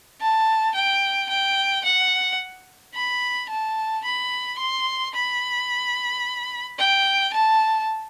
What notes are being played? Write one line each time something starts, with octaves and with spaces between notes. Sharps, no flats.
A5
G5
G5
F#5
B5
A5
B5
C6
B5
G5
A5